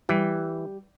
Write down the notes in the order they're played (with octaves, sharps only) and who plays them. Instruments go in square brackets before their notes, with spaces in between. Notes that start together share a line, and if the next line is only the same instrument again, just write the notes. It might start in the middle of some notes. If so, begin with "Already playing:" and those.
[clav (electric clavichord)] E3 [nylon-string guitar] G3